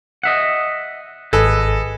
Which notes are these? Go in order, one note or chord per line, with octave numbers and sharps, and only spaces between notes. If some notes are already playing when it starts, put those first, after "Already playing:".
D#5 E5 F#5
G#1 G#4 A4 B4 D#5